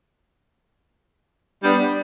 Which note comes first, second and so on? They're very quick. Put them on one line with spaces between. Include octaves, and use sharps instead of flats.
G3 D4 B3